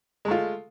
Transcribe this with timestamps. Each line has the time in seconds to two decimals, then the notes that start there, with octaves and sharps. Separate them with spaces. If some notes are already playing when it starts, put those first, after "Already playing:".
0.25 G#3
0.28 A3
0.31 F4